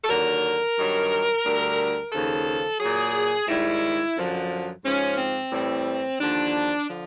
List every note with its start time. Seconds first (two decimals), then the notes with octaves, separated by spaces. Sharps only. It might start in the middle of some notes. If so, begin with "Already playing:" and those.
0.04 A4
0.08 D#2 D3 F#3 A#4
0.76 G2 D#3 F#3
1.44 D2 D3 G3
2.12 D#2 C#3 F3 A4
2.80 A#2 F#3 G#4
3.48 G#2 D#3 G3 E4
4.16 F#2 D3 F3
4.84 G#2 F3 C#4
5.18 C4
5.52 A2 E3 G3 C4
6.19 D#2 D3 F3 D4
6.88 D3 F3